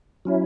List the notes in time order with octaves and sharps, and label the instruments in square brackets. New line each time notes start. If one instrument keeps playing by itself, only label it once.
[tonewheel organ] F#3 C#4 E4